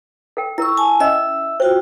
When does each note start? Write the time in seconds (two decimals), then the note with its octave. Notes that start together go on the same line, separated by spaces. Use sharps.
0.37 A4 A#4 G5
0.58 E4 A#4 C#6 E6
0.77 G#5 A5
1.00 C#4 D#5 E5 E6
1.60 F4 F#4 C5 G5